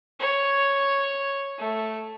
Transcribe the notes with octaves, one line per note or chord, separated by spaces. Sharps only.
C#5
A3